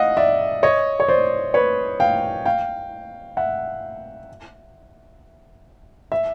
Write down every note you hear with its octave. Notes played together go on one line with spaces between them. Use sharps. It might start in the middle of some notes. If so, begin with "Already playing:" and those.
Already playing: D#5 F5 F#5
D5 E5
C#5 D#5
C#5
C5 D5
B4 C#5
F5 G5
F5 G5
E5 F#5
E5